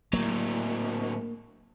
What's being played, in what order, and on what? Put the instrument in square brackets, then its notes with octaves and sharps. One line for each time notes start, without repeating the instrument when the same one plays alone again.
[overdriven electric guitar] A2 F#3 [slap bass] A#3